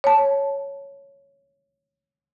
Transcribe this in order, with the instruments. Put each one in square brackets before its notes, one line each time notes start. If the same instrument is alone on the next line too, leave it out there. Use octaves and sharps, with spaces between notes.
[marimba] C#5 A5